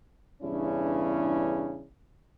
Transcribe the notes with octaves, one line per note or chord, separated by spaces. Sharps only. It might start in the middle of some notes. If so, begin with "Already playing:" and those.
E2 G2 C#3 C#4 D4 E4